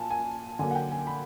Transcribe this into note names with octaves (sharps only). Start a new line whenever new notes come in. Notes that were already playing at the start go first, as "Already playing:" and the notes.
Already playing: A#2 G#5 A5
G#5
D3 F#3 A#3 G#5
F#5
G5
G#5
B5